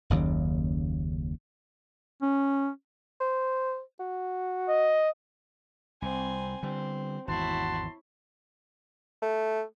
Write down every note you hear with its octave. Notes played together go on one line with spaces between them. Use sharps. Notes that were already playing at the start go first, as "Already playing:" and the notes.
F#1 D#2 C#3
C#4
C5
F#4
D#5
C2 C4 G#5
D3 G3 C4
G#1 E2 E4 F#4 C#5 A5 C6
A3